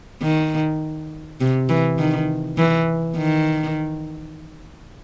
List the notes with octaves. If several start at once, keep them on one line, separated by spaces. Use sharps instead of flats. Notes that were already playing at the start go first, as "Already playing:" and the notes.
D#3
C3
E3
D#3
E3
D#3